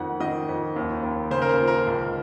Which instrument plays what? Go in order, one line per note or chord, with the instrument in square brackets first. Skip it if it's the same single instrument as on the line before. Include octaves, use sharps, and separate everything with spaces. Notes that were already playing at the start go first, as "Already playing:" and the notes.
Already playing: [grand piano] F2 D#3 F#5
D#3 D#5
F2
D#2
D#2
C#3 C5
A#4
C5
F3
A#4
C#2